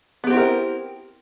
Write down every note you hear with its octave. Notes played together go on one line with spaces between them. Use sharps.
B3 C4 E4 G4 A#4